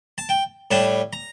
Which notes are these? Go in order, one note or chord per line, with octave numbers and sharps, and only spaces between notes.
A5
G5
A2 G3 D4 A5
A#5